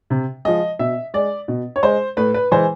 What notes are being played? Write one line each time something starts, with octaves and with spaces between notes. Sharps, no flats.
C3
F3 G#3 D#5
B2 E5
G#3 D5
B2
C#5
G#3 C5
A2 B4
B4
E3 G#3 C5